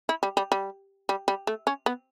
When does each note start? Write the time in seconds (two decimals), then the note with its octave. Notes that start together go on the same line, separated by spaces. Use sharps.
0.09 E4
0.23 G3
0.37 G3
0.52 G3
1.09 G3
1.28 G3
1.47 A3
1.67 C#4
1.86 B3